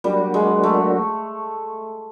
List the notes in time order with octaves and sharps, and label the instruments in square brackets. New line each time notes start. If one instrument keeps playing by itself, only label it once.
[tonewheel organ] F#3 A#3 D4 F#4 [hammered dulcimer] G3
[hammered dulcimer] G#3
A3